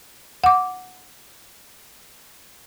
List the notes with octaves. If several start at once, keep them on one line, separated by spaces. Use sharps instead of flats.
F#5 D6